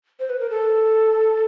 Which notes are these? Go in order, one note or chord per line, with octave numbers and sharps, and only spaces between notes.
C5
B4
A#4
A4